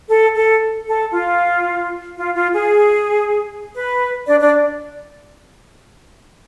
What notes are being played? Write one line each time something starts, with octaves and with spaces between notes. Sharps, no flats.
A4
A4
A4
F4
F4
F4
G#4
B4
D4 D5
D4 D5